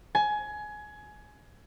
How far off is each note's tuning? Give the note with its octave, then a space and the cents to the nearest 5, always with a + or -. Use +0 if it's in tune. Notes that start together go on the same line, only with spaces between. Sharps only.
G#5 +20